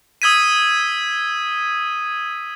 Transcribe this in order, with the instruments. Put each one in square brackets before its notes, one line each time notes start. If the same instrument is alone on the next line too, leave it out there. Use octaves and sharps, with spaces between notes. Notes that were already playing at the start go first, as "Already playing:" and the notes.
[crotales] D#6 E6 G#6 B6 D#7